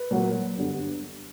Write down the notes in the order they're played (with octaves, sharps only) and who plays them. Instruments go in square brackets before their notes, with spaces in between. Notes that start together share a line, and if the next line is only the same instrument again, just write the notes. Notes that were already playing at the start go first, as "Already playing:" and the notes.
Already playing: [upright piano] B4
A#2 F#3 A#3
G2 D3 G3 B3